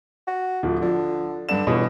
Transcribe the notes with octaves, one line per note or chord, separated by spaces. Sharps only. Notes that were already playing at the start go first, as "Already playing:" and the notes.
F#4
D1 F3
D3 F3
G2 D3 E7
C#2 G2 B2 E3